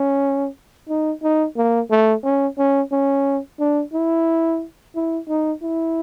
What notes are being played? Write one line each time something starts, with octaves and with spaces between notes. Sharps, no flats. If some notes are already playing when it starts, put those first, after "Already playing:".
Already playing: C#4
D#4
D#4
A#3
A3
C#4
C#4
C#4
D4
E4
E4
D#4
E4